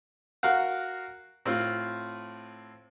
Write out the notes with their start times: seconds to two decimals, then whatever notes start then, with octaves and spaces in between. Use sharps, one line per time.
0.43 F#4 A#4 F5 F#5
1.45 A2 C4 F4